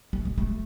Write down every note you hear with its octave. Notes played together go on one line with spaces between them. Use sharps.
A3
G#3
A3